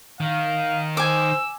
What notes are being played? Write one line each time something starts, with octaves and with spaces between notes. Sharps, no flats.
D#3 F5
C5 G#5 D6 E6